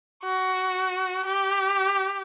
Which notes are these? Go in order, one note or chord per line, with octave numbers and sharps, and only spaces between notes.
F#4
G4